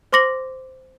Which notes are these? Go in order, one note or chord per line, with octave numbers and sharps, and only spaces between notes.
C5 C6 D6 A#6 C#7 F#7